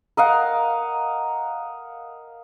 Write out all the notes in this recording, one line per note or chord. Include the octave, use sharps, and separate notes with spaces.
A#4 D#5 F5 F#5